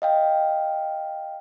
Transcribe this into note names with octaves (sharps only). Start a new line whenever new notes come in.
D#5 F5 G5